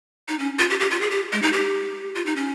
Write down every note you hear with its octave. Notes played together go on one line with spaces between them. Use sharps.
D#4
C#4
F4
G4
G4
F4
G#4
G4
G#3
D#4
G4
F4
D#4
C#4